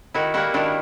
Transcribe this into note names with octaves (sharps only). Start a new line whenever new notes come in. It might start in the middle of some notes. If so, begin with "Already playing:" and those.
D#3 E4 F#4
G3 A#3 E4 F#4
D#3 D4 E4